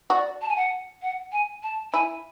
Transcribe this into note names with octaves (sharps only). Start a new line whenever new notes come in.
F#4 D5
A5
G#5
F#5
F#5
G#5
A5
E4 G#5